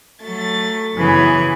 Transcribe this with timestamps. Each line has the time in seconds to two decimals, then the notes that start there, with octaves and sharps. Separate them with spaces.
0.21 F#3 A3 A6
0.95 F#2 C#3 E3 B3 G#4 G#6